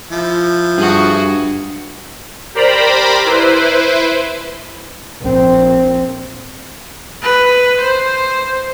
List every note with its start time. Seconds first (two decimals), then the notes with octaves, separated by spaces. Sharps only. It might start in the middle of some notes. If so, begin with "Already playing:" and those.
0.11 F3 E4
0.78 G2 F#4 G#4
2.55 G4 A#4 C5 D5 A#5 B5
3.26 E4 B4 C5
5.21 A#1 C4
7.23 B4
7.81 C5